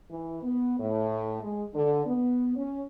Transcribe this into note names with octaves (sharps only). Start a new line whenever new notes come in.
E3
B3
A2
G#3
D3
B3
C#4